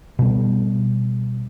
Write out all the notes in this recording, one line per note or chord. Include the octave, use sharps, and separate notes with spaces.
B2 G3